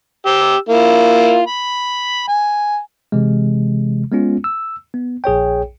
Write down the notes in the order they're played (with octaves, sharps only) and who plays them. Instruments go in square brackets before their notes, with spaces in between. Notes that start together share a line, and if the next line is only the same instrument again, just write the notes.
[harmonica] G4 E6
A#3 E4 F4
B5
G#5
[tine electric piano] C3 E3 G#3
G#3 B3 C#4 F4
E6
B3
A#1 G#4 C#5 G5